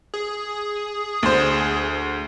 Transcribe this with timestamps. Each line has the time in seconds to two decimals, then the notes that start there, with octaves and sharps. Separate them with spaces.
0.14 G#4
1.23 D2 C5